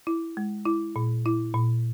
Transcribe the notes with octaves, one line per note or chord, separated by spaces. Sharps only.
E4
G#3
E4
A#2
E4
A#2